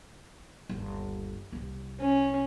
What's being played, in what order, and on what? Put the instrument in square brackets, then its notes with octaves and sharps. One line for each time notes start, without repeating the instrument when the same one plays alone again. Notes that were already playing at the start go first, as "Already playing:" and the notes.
[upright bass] G1 D#2
C2 B3
[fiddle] C#4